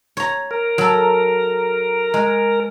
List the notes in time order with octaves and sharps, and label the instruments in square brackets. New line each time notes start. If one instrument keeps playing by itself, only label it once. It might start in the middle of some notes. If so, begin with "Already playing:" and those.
[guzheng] C#5 A#5
[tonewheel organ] A#4
[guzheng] F#3 A4
G#3